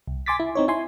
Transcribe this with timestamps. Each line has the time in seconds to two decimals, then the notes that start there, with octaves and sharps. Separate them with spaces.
0.08 C2
0.26 G#5 C6 D6 A6 B6
0.40 E4
0.55 C4 D#4 C#5
0.68 E4 G#5 C6